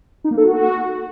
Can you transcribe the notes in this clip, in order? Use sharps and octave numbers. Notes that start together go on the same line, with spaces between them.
D#4
A#3
A4
F#4